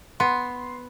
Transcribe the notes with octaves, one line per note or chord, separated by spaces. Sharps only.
B3 C6